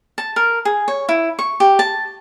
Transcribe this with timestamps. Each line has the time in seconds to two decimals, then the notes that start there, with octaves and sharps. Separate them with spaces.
0.18 A5
0.36 A#4
0.65 G#4
0.88 C#5
1.09 E4
1.39 C#6
1.60 G4
1.79 A5